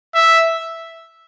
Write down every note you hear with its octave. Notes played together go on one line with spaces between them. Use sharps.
E5